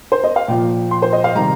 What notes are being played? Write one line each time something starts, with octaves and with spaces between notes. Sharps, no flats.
C5
D#5
F5
A#2 F3 G5
C6
C5
D#5
F5
C3 D#3 G3 A#5